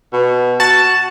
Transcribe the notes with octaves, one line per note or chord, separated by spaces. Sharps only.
B2
F#4 A5